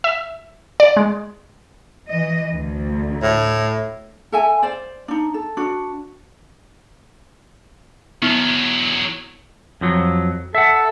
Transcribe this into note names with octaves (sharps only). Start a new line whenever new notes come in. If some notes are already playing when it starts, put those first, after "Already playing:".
E5
D5
G#3
E3 D#5
D2
A2
A4 E5 G#5
C5 D5
D4 D#4
A4
D4 F#4
E2 F#3 B3 E4
F2 F3 F#3
A4 E5 F#5